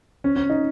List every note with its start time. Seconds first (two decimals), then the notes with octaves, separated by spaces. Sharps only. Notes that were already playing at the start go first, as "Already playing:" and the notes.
0.24 C#4
0.36 C#4
0.50 D#4